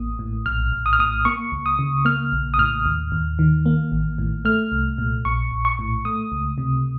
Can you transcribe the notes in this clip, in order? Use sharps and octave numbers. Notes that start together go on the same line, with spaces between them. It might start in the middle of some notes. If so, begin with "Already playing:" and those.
Already playing: A1 A2 A#3 D#6
A2
A#1 F6
A#1
D#6
F6
A2 D#6
A#3 C#6
C#2
D#6
C#3
A#3 F6
A#1
D#6
A2 F6
D#2
D#2
D#3
A#3
A1
A2
A3 F6
C2
A#2
A#1 C#6
A#1
C#6
A2
A3 D#6
C#2
C3